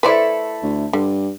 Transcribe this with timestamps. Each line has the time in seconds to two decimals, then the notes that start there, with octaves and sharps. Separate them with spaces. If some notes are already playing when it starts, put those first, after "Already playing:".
0.03 A3 E4 A4 B4 C5 D5
0.63 D2
0.93 G2 D3